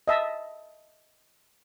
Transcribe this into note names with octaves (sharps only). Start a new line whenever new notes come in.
D#5 E5 A5